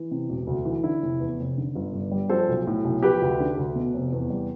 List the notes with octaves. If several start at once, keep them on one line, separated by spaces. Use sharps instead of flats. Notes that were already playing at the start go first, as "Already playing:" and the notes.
Already playing: E3
C3
E1
D2
E3
D3 E4
F1
E2
F1
D3
G1
G2
G3
F3 A4 C5
B1
A2
B1
F3 G4 B4
D2
D3
D2
B2
F1
E2
G3